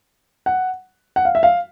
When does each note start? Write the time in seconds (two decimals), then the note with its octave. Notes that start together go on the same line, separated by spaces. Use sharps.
0.46 F#5
1.16 F#5
1.25 F5
1.35 E5
1.43 F5